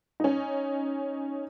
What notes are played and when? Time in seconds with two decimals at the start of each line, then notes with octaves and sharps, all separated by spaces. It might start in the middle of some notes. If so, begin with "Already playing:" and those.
0.20 C#4 D#4